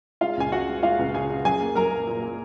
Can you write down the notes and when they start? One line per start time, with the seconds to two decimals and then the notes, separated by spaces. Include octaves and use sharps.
0.21 G#3 F4 F5
0.37 C#2 G#5
0.52 G#3 F#4 F#5
0.68 G#3
0.83 G#3 F4 F5
0.99 C#2
1.14 C#3 G#4 G#5
1.30 C#3
1.45 F#3 G#4 G#5
1.61 A#3
1.75 F#3 A#4 A#5
1.91 A#3
2.07 A#2
2.22 A#2